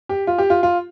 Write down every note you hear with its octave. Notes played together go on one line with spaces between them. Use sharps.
G4
F4
G4
F4
F4